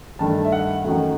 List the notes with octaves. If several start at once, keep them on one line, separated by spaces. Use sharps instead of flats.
G2 D#3 A3 A5
E5
F#5
F#2 D#3 F#3 A3 F#5